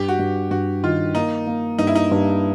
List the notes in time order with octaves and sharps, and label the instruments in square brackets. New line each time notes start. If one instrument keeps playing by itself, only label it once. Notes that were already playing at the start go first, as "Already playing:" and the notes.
Already playing: [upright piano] G2 [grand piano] G4
[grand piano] F#4
[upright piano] G2
[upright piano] G2 [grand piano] F#4
[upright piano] D#3 [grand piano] F4
[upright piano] A#3 [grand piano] D#4
[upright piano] A#3
[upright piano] G2 [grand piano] D#4
[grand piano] E4
D#4
[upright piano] G2